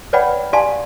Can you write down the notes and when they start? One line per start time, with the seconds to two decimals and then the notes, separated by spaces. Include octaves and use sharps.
0.13 B4 C#5 D5 F#5 G5 B5
0.53 G4 D5 F5 G#5 A5 C6